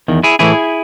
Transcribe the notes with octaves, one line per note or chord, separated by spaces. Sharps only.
E2 D#3
E4 G#4
A2 E3 E4 G#4